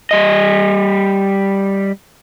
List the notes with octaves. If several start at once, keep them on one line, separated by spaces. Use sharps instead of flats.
G3 D#5